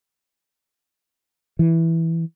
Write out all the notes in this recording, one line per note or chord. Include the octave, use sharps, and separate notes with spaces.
E3